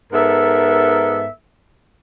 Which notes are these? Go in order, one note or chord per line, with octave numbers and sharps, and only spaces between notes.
G#2 B3 A4 A#4 E5